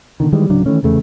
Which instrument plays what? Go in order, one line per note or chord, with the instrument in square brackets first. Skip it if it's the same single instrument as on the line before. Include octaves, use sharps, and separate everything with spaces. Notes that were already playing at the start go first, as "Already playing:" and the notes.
[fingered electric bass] B2 D3 D#3
D#3 E3 G3 G#3
D1 C#3 F#3 D4
D#3 E3 A3 C#4
F1 E2 C#3 A3